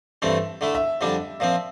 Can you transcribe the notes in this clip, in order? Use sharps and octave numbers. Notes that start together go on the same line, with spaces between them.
G2 E3 A3 C4 E5
D3 A3 E4
E5
F2 D3 G3 D4
A#2 F3 C4